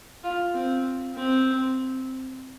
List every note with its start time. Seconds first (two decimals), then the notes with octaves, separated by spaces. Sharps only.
0.24 F4
0.55 C4
1.16 C4